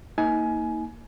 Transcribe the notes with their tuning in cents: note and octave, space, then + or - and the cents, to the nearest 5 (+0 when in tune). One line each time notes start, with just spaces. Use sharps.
A#3 +0 D#4 +35 G#5 +20